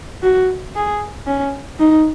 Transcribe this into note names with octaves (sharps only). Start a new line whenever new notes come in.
F#4
G#4
C#4
D#4